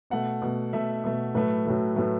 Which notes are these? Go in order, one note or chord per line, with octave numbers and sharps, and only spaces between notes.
B2 A3 F#5
B2 A3
B2 A3 E5
B2 A3
A2 F#3 A3 B4
A2 F#3 A3
A2 F#3 A3 B4